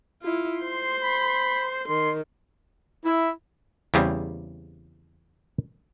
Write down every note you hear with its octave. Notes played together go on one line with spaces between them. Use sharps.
E4 F4
C5 C6
B5
D#3 C6
E4
E2 C#3 G3 C4